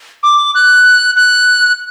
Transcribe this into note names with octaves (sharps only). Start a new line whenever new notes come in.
D6
F#6
F#6